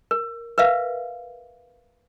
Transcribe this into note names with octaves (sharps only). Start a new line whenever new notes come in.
A#4
A#4 B4 E5 F5